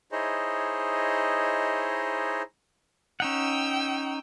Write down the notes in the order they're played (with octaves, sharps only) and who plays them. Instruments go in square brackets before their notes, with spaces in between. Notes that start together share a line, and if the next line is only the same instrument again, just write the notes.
[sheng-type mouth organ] D#4 E4 G#4 C5 C#5 D#5
[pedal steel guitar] C#4 D#4 F#5 [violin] G5 E6